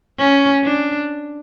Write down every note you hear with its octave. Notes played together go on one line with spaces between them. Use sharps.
C#4
D4